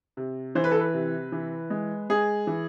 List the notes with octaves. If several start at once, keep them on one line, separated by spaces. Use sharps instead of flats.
C3
E3 C5
B4
A4
B4
C3
E3
G#3
G#3 G#4
E3